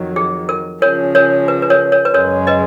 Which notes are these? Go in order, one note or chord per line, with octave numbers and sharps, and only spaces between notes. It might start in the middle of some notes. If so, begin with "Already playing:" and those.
Already playing: F2 D#3 F#3
G#4
A#4
C#3 F3 G#3 C#4 A#4 C#5
A#4 C#5
B4
B4
A#4 C#5
A#4 C#5
B4
F#2 C#3 G#3 A#4 C#5
B4 D#5